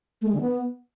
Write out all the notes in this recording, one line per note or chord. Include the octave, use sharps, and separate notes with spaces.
A3
G#3
D3
B3